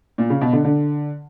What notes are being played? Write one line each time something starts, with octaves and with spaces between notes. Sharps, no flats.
A#2
C#3
B2
D3
D3